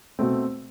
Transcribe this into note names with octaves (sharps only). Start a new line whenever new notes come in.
B2 A3 C4